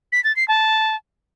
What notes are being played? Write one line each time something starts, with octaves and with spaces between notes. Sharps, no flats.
B6
A6
C7
A5